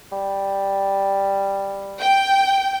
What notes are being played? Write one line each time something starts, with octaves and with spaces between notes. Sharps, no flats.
G3
G5